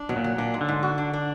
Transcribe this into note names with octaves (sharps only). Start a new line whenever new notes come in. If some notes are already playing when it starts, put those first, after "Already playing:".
Already playing: D4
B2 F#3
A#2
F#3
A#2 D4
G#2
D3
G#2
F#4
D4
D4